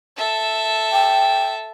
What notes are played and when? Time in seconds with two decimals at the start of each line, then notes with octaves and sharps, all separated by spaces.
0.17 A4 E5
0.92 G5